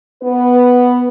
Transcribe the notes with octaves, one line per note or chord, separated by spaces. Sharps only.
B3 B4